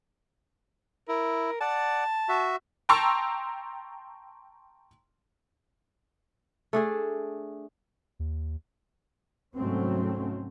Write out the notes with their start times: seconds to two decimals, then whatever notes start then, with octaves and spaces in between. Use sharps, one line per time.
1.08 E4 A#4
1.61 D5 F#5 A5
2.29 F#4 E5
2.89 G5 A5 A#5 C6 C#6 E6
6.73 A3 D4 G#4
8.19 D#2
9.57 C2 G#2 F#3 A3 C4 C#4